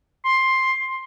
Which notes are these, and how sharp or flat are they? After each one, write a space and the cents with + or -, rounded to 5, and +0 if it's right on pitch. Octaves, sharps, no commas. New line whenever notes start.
C6 +10